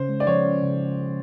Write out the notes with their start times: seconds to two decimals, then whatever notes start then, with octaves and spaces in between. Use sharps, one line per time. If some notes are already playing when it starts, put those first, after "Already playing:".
Already playing: C#3 C#4 C5
0.09 G#3
0.20 D5
0.27 F3 C#5
0.44 C#4
0.62 C#3